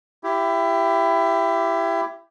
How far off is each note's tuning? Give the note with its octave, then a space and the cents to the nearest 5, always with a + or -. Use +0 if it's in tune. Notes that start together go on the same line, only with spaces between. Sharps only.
E4 +20 G4 +0